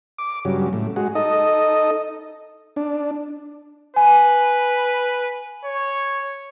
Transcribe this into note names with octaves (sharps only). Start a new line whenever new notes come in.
D6
G2 C#3 F#3
A2
G#3 F#4
D#4 A4 D#5
D4
B4 G#5
C#5